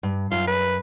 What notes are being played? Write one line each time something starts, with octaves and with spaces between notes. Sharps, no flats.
G2
F#2 F4
B4